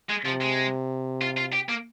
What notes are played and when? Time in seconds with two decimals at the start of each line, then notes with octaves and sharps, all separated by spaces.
0.10 G#3
0.26 C3 F3
0.42 G#3
1.21 F4
1.37 F4
1.53 G4
1.69 A#3